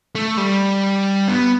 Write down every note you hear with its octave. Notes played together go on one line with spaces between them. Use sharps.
A3
G3
B3